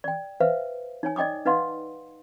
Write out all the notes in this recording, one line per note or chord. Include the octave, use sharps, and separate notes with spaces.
D5 G5
B4 C5 E5 F5
D#4 C#5 G#5
D5 D#5 G5 D6 D#6
D#4 B4 D#5 F5 F#5 C6